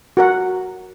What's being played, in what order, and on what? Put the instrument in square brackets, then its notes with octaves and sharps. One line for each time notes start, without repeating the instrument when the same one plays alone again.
[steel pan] F#4 A#4 F#5